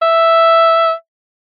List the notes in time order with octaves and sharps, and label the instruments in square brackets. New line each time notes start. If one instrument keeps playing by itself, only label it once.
[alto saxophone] E5